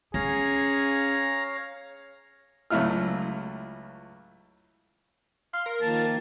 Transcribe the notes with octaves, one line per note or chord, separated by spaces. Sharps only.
C#4 G#4 C#5 F5 A#5
C#2 F#3 A3 E4 F4 F6
F5 C6
A#4
D#3 F3 A#3 A5